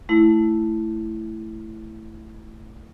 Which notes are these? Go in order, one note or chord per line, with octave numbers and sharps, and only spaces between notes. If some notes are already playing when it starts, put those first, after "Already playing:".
A3 E4